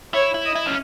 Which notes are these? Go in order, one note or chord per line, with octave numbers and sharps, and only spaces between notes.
E4 C#5
E4
D#5
E4
C#4